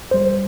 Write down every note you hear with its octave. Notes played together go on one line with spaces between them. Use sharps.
G2 G3 C5